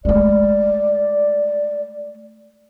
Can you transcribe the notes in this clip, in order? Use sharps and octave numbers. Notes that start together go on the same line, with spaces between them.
G#3 A3 D5